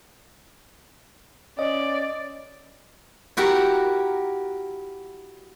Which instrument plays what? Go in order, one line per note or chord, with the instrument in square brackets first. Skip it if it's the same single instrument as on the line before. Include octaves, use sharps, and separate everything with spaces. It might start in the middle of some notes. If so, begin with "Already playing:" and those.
[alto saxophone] C#4 [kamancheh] D5 [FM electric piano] D#5
[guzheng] E4 F#4 G4 A#4